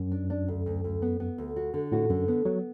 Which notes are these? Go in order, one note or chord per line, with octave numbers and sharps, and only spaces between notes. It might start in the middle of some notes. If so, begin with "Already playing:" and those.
Already playing: F#2
D4
D4
D2
D2
D2
B3
B3
D2
F#4
D3
A2 F#4
F#2 D3
B3
F#3 B3